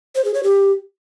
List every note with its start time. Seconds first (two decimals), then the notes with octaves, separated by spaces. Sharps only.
0.15 C5
0.25 G#4
0.34 C#5
0.43 G4